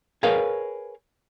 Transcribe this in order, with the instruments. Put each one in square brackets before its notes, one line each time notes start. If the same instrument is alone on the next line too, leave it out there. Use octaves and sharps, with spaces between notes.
[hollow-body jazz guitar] G#4 A#4 B4 C#5 F5